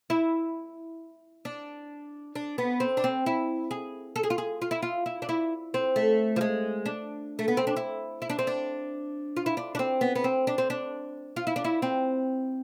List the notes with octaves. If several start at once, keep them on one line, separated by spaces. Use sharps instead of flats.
E4
D4
D4
B3
C4
D4
C4
E4
G#4
A4
G#4
F4
G#4
F4
E4
F4
E4
D4
E4
C4
A3
F3
G#3
D4
A3
B3
C4
D4
E4
E4
D4
C4
D4
F4
E4
D4
D4
C4
B3
B3
C4
D4
C4
D4
F4
E4
D4
E4
C4